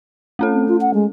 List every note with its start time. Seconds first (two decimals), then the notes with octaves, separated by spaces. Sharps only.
0.39 A3 C#4 A4
0.53 C4
0.68 F4
0.81 F#5
0.94 G#3